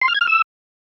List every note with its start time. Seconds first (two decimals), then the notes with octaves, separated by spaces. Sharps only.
0.02 C6
0.08 F6
0.14 G#6
0.21 F6
0.27 E6